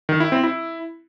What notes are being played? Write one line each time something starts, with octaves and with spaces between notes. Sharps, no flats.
D#3
E4
C4
E4